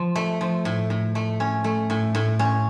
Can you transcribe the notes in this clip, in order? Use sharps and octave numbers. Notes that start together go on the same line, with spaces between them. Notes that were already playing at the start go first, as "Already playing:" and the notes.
Already playing: F3
A3
F3
A2
A2
A3
C#4
A3
A2
A2
C#4